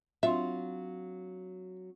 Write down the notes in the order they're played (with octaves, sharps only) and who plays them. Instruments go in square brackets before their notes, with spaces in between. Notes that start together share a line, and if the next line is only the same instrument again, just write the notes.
[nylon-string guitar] F#3 F4 [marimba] C4 D4 C6 [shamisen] E5